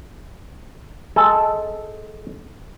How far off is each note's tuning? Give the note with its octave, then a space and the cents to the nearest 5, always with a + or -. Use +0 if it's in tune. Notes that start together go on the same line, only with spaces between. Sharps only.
G#3 +15 A4 +0 G#5 +0